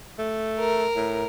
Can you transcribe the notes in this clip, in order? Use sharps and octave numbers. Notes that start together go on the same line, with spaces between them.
A3
A#4
A2